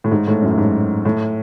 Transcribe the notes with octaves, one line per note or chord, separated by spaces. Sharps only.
A2
G#2
A2
F#2
A2
G#2
A2